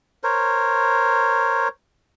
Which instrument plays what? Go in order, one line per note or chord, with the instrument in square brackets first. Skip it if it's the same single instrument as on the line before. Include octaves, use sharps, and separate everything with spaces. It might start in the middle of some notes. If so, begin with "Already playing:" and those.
[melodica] A#4 C5 C#5